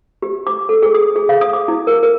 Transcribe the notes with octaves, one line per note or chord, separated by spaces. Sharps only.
G4
D6
A4
G#4
D#6
G#4
F5
D#6
D6
E4
A#4
A#4